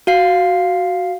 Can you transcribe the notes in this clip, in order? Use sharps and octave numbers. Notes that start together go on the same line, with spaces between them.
F#4 F5 C7